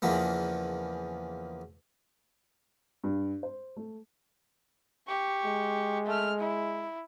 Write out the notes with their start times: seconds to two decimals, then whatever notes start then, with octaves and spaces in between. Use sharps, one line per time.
0.02 E2 C#3 E3 F3 A#3 B3
3.04 G2
3.43 C5
3.76 A3
5.07 G4 C#6
5.45 G#3
6.06 A3 F6
6.39 E4